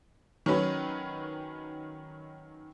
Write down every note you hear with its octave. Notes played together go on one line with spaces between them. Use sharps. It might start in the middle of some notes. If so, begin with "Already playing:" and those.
D#3 F#3 C#4 B4